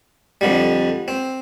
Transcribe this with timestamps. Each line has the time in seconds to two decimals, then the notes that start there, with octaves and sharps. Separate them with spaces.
0.41 F2 D3 G3
1.08 C4